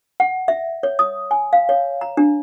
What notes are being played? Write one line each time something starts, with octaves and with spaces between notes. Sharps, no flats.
F#5
E5
C#5
D#6
G#5
F5
C#5
A#5
D4